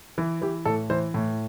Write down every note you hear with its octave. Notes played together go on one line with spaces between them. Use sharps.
E3
E3 G4
A2 A4
E3 C5
A2